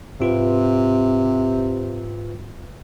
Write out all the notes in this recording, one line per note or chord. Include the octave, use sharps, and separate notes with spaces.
G#2 C3 F4 B4